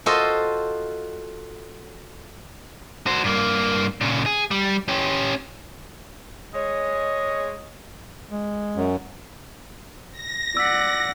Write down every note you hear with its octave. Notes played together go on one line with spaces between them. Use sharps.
F4 F#4 A4 C5 D#5
F#4 C5
G2 A#3
A#2 C#3
G#4
G3
C#4 G4
G#3 C#5 D#5
G#3
F#2
A#6
D5 F#5 E6 B6